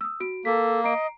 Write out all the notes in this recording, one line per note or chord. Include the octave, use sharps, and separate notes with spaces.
D#6 E6
F#4 D7
A#3 A4 B6
D#5 A#5 C7 D7